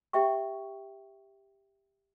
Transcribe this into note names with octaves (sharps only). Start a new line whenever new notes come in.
G4 E5 G5 C#6